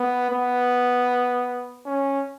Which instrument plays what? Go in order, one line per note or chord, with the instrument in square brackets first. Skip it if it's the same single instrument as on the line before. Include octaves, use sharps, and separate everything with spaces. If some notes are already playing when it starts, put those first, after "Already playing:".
Already playing: [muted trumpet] B3
B3
C#4